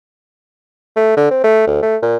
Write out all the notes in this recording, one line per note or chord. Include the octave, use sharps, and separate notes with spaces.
A3
D3
C4
A3
D2
A3
A#2